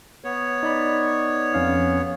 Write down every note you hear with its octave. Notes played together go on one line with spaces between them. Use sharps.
B3 C#5
D#4 D5 B5
F2 C#4 F5